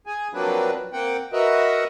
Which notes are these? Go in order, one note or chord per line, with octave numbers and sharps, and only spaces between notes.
G#4 G#5
F3 F#3 A#3 C4 D4 B4
A#3 C4 F#5 G5
F#4 A#4 B4 D#5 E5 F#5